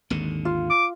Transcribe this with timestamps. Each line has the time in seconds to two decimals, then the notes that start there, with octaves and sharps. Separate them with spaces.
0.10 G#1 D#2 D3
0.45 F4
0.70 D6